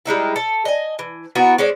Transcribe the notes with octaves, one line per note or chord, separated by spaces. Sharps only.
G3 G#3 D#4 E4
A4
D#5 G#5
E3
B3 E4 F#4 A#4
G#3 C#4 C5 D5